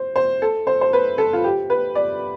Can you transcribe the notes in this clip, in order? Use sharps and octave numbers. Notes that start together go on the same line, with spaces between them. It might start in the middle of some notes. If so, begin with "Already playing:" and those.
Already playing: C5
C5
A4
C5
C5
B4
A4
F4
G4
B4
D5